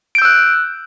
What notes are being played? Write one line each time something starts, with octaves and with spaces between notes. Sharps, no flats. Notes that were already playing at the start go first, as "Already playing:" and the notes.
E6 F#6 G6 D7